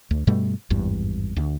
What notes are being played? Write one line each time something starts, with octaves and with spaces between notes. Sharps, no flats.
D2
G2 B2 G3 A3
G#1 E2 G2
D2